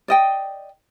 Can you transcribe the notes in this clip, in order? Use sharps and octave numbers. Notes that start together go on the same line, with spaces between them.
D5 D#5 G5